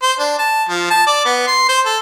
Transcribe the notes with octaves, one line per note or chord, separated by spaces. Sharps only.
C5
D4
A5
F3
A5
D5
B3
C6
C5
A4